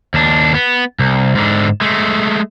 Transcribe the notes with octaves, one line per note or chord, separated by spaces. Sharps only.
D#2 D4
B3
C2
G#2 D3
G#3 A3